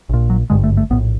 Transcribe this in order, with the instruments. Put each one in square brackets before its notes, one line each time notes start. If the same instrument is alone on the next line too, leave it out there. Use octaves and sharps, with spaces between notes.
[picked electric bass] A#1 A#2
F#3
G#1 G2 D3 G#3
A3
A3
A#1 A2 B3